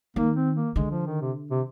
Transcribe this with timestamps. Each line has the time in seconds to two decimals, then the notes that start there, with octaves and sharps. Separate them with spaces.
0.16 D#3 A#3
0.36 C4
0.56 A#3
0.76 D3 G#3
0.91 F3
1.06 D#3
1.21 C3
1.51 C3